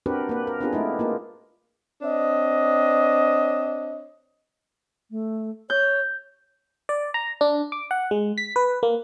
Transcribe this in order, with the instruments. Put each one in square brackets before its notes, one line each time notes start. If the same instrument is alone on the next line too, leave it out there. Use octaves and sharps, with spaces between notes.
[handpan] C4 D4 F#4 G4 A#4 B4
A#3 B4
A#4
B3 C4 D4 F4 G4 G#4
G#3 A3 D#4 E4
A#3 D#4 F4
[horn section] C4 D4 C#5 D#5
[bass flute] A3
[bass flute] C#5 [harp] G6
[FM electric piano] D5
A#5
D4
D6
F#5
G#3
B6
B4
A#3